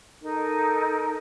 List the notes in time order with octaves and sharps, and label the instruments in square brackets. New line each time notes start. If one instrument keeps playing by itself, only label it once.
[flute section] D#4 A4 A#4